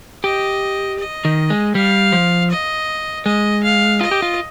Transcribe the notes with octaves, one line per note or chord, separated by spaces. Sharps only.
G4 D#5
D#5
D#3
G#3
G3 F5
F3
D#5
G#3 D#5
F5
F4 D#5
G4
F4